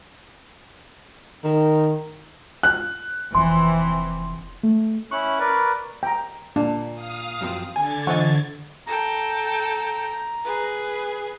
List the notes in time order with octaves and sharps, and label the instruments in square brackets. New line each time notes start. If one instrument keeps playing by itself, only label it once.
[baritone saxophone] D#3
[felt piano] F#6
[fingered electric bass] F1 F2 [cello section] E3 C4 [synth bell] C6
[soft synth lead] A3
[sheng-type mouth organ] C#4 E4 F#6 [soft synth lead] C#6
[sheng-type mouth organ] A#4 B4 D5
[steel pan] G5 A#5
[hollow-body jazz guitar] A#2 [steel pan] D4
[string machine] F5 D#6
[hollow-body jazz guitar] F#2 F3 C4
[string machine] D3 G#6 A6 [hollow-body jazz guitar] G#5
[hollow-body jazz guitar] E3 F4 D#5 [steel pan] C5 F#5 C#6
[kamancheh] A4 G5 [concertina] A#5
[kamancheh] G#4 B4